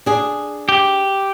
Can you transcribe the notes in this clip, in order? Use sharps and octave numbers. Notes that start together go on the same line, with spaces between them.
D4 G#4
G4